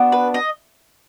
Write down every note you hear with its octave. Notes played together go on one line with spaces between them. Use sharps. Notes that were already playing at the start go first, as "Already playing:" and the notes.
Already playing: B3 D4 F#4
B4
D#5